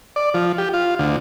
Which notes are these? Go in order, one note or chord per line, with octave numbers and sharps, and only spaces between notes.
D5
F3
G4
F4
D2